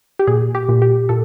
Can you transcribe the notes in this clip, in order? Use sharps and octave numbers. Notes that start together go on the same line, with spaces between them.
G4
A#2 G#4
G4
A#2
G4
A#2 A4